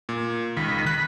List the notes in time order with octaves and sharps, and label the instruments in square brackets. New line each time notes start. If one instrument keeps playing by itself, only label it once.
[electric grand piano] A#2
[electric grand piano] C#2 [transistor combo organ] D#3 B5
[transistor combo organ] B5 [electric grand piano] F#6